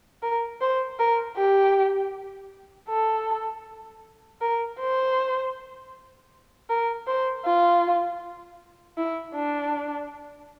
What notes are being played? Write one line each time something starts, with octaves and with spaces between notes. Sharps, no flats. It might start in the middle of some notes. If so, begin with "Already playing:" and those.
A#4
C5
A#4
G4
A4
A#4
C5
A#4
C5
F4
E4
D4